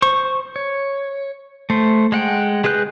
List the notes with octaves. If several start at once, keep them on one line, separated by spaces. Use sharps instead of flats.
C5 C#6
C#5
A3 C5
G#3 F#5 G5
G#3 G#4 B4 F#6 G6